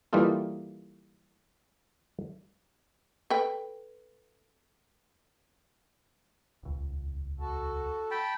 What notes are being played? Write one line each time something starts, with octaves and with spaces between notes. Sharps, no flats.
E3 G3 A#3 D#4 F4 A4
A4 B4 G5
D#1 C#2
F#4 A4
G5 A5 B5